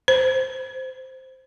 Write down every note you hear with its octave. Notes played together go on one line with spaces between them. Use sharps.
C5